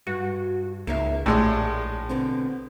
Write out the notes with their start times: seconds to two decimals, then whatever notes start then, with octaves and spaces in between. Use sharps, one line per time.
0.07 G2 F#4
0.87 C#2 A#3 D#4 E5
1.26 A#1 A2 G#3 F4 G4 D5
2.09 B2 D3 C4